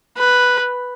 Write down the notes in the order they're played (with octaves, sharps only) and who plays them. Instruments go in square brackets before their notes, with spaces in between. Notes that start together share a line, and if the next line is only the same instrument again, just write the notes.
[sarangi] B4